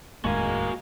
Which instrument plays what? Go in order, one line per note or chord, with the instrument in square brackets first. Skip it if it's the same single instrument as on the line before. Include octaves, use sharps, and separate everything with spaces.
[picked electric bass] F1 D#2 A2 [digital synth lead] G#3 [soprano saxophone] A#3 [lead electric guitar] F#4 G#5